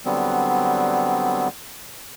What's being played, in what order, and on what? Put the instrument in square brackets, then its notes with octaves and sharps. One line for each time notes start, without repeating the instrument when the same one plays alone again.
[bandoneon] D3 F#3 G3 B3 C4